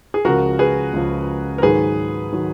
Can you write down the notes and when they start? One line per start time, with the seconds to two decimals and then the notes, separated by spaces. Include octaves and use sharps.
0.14 G#4
0.25 C#2 C#3 F3 F#4 A#4
0.59 G#4 B4
0.93 C#2 C#3 F3
1.58 A#4
1.62 G#2 D#3 F#3 G#4 B4
2.33 D#3 F#3